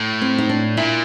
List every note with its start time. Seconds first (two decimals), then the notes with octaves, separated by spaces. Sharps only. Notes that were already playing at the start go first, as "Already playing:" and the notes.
Already playing: A2
0.22 C4
0.38 D#4
0.49 D4
0.77 A#2 E4